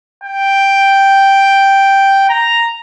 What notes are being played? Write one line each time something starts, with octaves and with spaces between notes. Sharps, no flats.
G5
A#5